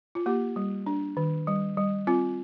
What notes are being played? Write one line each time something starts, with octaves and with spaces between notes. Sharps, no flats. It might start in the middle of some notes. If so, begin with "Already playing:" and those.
F4
A#3 G4
G3
D4
D#3
G3
G3
C4 F4